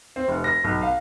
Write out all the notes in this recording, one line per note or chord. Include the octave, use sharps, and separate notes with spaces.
C4
F1
A#6
B1
F5